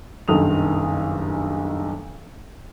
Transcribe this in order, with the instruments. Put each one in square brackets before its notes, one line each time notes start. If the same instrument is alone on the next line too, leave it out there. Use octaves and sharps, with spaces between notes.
[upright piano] F#1 B1 G2 D#3 D#6 F7